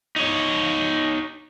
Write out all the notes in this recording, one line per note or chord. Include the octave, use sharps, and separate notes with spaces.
D#4 C#5